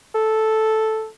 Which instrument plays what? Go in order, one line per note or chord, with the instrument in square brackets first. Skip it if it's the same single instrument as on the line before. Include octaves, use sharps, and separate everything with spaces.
[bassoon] A4